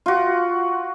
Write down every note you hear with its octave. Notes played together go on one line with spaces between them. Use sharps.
F4 F#4